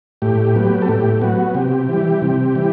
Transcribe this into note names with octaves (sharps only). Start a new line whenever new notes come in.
A2 G4
F#3 B3
A4
A2 G4
F#3 B3 F#4
C3 G4
E3 G3
C3
E3 G3